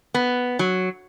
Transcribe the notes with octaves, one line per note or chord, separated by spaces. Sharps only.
B3
F#3